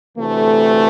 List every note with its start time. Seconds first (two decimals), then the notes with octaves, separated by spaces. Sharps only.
0.17 D2 C3 E3 A3